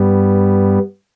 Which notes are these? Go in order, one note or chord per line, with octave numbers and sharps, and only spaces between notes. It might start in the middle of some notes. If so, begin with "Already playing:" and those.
Already playing: G2 G3 B3